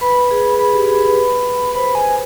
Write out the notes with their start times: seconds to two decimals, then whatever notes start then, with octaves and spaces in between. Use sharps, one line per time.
0.01 B4 B5
0.31 G#4
0.59 G#4 B5
0.74 G4
0.88 G#4
1.03 B4
1.75 C5 B5
1.95 G#5